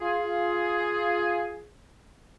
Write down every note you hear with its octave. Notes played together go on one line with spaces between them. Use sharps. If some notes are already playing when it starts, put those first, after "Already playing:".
F4 G#4